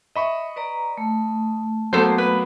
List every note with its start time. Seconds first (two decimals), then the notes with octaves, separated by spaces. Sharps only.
0.16 D#5 E5 B5 C#6
0.56 B4 D5 A#5
0.97 A3
1.93 F#3 A#3 B3 A4 C5
2.18 B4